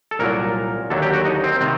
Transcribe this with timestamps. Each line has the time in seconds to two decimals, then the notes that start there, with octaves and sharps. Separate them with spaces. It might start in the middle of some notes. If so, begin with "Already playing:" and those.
0.11 A4
0.19 C2 A#2 F#3 A#4
0.90 D#2 D3 F#3 A4
1.02 G4
1.13 F#4
1.25 D#4
1.44 C4
1.61 C3 D#3 C4